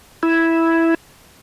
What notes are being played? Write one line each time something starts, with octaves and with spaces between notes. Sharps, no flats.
E4